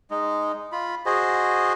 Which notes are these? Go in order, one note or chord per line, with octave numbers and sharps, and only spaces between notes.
G#3 D#4
F4 B5
F#4 G#4 C5 D#5